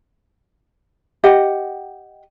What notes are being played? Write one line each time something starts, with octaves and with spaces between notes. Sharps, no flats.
G4 D#5 F#5